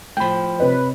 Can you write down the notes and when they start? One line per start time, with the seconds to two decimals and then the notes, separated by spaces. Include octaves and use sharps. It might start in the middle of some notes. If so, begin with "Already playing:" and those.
0.17 A2 F3 G5 B5
0.60 C3 B4 C#5 D#5